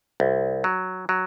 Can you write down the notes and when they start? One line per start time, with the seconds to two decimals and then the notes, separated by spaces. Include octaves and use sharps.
0.20 C2
0.64 F#3
1.09 F#3